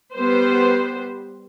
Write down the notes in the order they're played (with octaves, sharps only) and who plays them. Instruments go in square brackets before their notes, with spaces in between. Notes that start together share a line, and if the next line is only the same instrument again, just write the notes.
[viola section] G3 B3 B4 C5